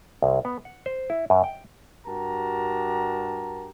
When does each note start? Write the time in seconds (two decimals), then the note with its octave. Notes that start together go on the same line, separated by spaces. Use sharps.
0.22 C2
0.45 B3
0.65 F#5
0.86 C5
1.10 E4
1.30 F#2
1.44 G5
2.06 G2 F#4 G4 A#4 A5 A#5